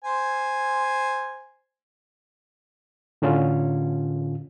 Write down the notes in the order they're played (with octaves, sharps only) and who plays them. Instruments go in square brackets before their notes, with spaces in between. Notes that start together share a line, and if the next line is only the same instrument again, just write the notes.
[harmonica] C5 G#5
[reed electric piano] A2 D3 C#4 F4